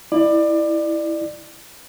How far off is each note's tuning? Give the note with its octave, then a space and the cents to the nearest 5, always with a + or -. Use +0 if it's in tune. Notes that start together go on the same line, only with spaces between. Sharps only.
E4 -5 D5 +25